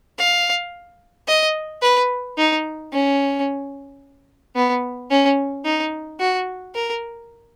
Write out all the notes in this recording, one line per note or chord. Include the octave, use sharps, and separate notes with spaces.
F5
D#5
B4
D#4
C#4
B3
C#4
D#4
F#4
A#4